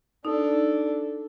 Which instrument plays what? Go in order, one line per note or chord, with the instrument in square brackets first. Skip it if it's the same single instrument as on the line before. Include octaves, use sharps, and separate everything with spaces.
[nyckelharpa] D4 A4 [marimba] D#4